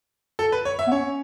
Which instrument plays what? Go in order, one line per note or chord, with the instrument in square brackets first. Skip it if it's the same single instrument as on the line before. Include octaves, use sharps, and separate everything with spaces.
[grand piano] A4
B4
C#5
E5
[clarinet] B3
[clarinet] C#4 [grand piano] C#5